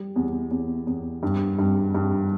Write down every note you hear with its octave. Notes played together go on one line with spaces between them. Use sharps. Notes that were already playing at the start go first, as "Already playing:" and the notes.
Already playing: G3
E2
E2
E2
G2
G2
G2